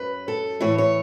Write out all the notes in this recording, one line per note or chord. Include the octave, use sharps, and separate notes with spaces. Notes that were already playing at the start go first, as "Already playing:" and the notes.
Already playing: F#2 F#3 B4
A4
A2 E3 C#5
C#5